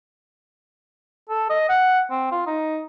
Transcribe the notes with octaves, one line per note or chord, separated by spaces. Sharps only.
A4
D#5
F#5
C4
F4
D#4